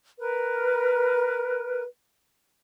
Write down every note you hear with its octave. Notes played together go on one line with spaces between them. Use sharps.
A#4 B4